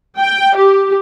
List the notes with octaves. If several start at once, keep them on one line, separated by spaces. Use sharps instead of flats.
G5
G4